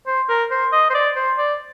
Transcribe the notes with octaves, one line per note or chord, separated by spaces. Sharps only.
C5
A#4
C5
D#5
C5
D5
C5
D5